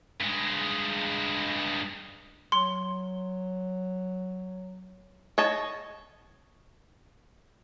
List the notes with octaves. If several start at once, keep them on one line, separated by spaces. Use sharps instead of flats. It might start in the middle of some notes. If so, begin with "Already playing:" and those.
G2 G#3
F#3 C6
C#5 D#5 A5